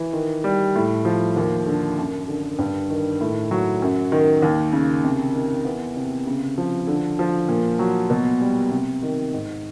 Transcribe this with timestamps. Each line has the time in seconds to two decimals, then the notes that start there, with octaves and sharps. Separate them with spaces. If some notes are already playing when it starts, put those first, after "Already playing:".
Already playing: E3
0.13 D#3
0.44 G3
0.75 A2
1.05 F3
1.36 D#2
1.66 D3
1.98 F#2
2.28 D3
2.59 G2
2.90 D#3
3.21 A2
3.51 F#3
3.82 F#2
4.12 D#3
4.42 D#2
4.73 C#3
5.04 C3
5.34 D#3
5.65 E2
5.96 C3
6.27 C#3
6.58 F3
6.87 D3
7.19 F3
7.48 A#2
7.79 F#3
8.10 B2
8.41 G3
8.71 C3
9.03 D#3
9.33 G#2